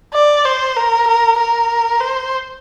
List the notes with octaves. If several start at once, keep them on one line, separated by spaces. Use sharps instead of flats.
D5
C5
A#4
A#4
A#4
C5